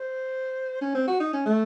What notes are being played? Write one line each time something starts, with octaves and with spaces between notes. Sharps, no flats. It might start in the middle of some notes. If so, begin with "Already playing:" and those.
Already playing: C5
C#4
C4
F#4
D#4
C#4
A3